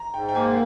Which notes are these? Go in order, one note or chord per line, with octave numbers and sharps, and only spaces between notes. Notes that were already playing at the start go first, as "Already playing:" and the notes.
Already playing: A#5
G#2 G5
G5
A#3 G#5